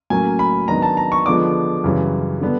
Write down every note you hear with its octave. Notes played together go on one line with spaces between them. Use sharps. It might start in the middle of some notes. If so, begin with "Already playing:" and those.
A2 F#3 A#3 C#4 G#5
B5
G#2 D#3 F#3 B3 D4 A#5
A5
A#5
C#6
D3 F3 G#3 B3 D4 D6
F#2 C#3 E3 G3
D3 G3 B3 D4